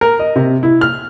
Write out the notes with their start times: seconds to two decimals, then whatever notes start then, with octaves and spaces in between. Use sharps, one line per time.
0.01 A#4
0.19 D#5
0.36 C3
0.63 E4
0.81 F6